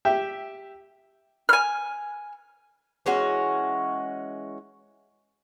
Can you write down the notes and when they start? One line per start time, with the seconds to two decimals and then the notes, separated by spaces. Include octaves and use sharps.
0.05 G4 E5 G5
1.49 G#5 F6
3.06 E3 G#3 C#4 F#4